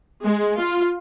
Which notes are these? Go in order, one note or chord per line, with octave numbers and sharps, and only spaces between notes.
G#3
F4